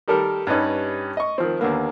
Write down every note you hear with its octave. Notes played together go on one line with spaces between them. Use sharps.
D#3 G3 G4 A4 A#4
G2 G3 C#4 D#4 B4
D#5 C#6
D#3 F3 C4
D#2 D3 A#3 B3